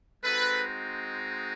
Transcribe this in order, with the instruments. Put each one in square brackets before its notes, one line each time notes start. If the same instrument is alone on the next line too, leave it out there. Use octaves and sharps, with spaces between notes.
[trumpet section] G#3 C4 D#4 F#4 A4 B4